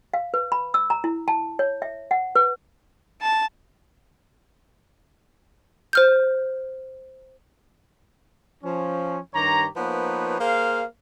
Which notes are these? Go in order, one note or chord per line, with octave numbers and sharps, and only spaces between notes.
F5
B4
B5
E6
A#5
E4
A5
C#5
E5
F#5
B4
A5
C5 F6 G6
F3 C#4
G2 D#3 G4 C#5 A#5
F3 A#3 B3 D#4 B4 C#5
A#3 G#4 C5 F5